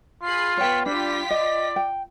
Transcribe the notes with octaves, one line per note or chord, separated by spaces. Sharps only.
F4 G#4 B5 C7
B3 C#5 G5 B6 C#7
G3 D4 F4 G5 B6
D5 D#5
G5